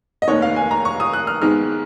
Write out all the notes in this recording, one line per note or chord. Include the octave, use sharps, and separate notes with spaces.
D#5
F1 D#2 D#3 C#5
F5
G#5
A#5
C#6
D#6
F#6
F6
G#2 D#3 G#3 B3 F6